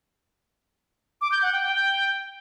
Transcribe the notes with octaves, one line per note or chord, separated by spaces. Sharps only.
D6
G6
F#5
G5
G5